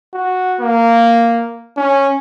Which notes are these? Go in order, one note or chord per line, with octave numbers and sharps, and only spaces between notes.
F#4
A#3
C#4